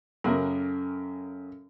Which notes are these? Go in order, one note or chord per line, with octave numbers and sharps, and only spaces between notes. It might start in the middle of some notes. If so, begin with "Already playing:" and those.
F#2 C#3 C#4 A4 A#4